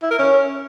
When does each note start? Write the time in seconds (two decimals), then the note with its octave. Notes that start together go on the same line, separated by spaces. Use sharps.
0.03 E4
0.11 A#4
0.19 C#4